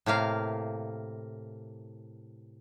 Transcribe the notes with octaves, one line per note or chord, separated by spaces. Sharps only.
A2 C3 A#3 F5